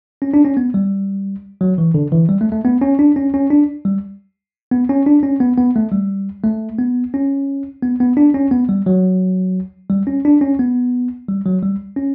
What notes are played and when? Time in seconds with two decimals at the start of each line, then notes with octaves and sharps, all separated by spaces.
0.22 C#4
0.34 D4
0.45 C#4
0.57 B3
0.74 G3
1.61 F#3
1.78 E3
1.94 D3
2.12 E3
2.29 G3
2.41 A3
2.52 A3
2.65 B3
2.81 C#4
2.99 D4
3.16 C#4
3.34 C#4
3.50 D4
3.85 G3
4.71 B3
4.89 C#4
5.06 D4
5.23 C#4
5.40 B3
5.58 B3
5.76 A3
5.92 G3
6.44 A3
6.79 B3
7.14 C#4
7.83 B3
8.00 B3
8.17 D4
8.34 C#4
8.51 B3
8.69 G3
8.86 F#3
9.90 G3
10.07 C#4
10.25 D4
10.41 C#4
10.59 B3
11.28 G3
11.46 F#3
11.63 G3
11.96 C#4